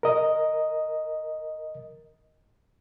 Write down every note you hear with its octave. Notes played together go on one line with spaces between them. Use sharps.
A#4 D#5